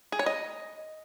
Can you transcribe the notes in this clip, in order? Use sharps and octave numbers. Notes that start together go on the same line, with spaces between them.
G#4
C#5
D#5